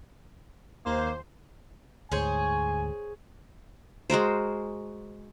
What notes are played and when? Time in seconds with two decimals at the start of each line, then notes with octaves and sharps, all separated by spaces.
0.86 D#2 A#3 C5
2.12 D2 G#2 G#4 C5 C#5 G#5
4.10 G#3 F#4 A#4 C5